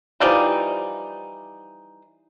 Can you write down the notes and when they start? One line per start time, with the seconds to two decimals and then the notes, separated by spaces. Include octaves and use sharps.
0.20 E3 F3 G3 D#4